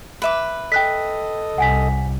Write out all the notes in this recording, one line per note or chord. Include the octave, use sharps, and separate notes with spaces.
B4 E5 D6
A4 D#5 G5 F#6 B6
C2 F#5 G#5 B6